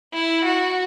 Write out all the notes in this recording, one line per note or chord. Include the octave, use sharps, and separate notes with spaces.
E4
F#4